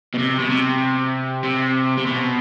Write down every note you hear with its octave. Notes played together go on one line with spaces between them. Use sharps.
B2
C3
B2
C3
C3
C3
B2